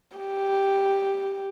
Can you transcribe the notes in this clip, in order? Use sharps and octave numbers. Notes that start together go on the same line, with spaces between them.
G4